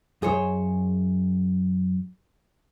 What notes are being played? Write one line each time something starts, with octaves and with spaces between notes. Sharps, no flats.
F#2 G#4 C5 C#5